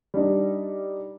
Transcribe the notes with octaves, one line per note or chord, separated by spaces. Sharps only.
G3 D4 D#4